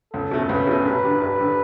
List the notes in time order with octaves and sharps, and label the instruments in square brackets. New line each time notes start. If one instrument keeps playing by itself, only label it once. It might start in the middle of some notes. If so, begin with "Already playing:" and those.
[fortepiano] C#2 [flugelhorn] A4
[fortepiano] B2 A3 C#4
[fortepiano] C#2 [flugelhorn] B4
[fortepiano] B2 A3 C#4
[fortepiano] A1 [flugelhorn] B4
[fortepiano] G2 D3 G3
[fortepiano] A1 [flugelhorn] B4
[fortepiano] D3 G3